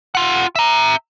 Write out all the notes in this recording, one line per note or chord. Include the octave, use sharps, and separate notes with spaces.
F4 F#5
E5 A#5